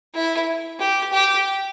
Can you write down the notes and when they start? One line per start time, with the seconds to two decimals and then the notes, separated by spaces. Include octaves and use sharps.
0.14 E4
0.79 G4
1.13 G4